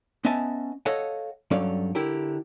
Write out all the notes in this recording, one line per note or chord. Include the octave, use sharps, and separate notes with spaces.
B3 C#4 D#5 E5 G#5 A5
A4 C#5 D#5 F5 F#5
G2 F#3 C#4 A4 D5 F5
D3 E4 G4 A#4